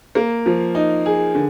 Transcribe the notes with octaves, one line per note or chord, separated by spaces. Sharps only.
A#3
F3
D#4
G#4
D3